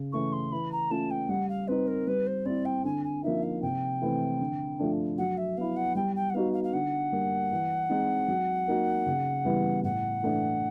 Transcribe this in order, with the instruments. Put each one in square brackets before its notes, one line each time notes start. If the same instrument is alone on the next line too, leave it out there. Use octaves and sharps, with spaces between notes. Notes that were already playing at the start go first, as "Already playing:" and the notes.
Already playing: [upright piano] C#3
[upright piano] E3 A3 C#4 [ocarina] C#6
[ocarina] C6
[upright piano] E3 [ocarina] B5
[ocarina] A#5
[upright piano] A3 C#4 F4 [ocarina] A5
[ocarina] G5
[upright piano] G3 [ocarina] F#5
[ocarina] F5
[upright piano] C4 D#4 [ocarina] B4
[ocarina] A#4
[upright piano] G3 [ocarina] B4
[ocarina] C5
[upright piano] C4 E4 [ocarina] D5
[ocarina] G5
[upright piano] D3 [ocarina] G#5
[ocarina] G#5
[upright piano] F3 A#3 D#4 [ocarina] E5
[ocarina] F5
[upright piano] C3 [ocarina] G5
[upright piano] E3 A3 C4
D3
F3 A3 D4
[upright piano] F#3 [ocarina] F#5
[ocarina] E5
[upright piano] B3 E4 [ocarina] F5
[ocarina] F#5
[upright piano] G3 [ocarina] G5
[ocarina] G5
F#5
[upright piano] B3 D#4 F#4 [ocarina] F5
[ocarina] F5
F5
[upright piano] D3 [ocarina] F#5
[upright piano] G3 A#3
E3
G#3 C4 D#4
F#3
A#3 D#4 F#4
C#3
E3 G3 B3 E4
[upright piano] A2 [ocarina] F#5
[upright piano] E3 A3 D4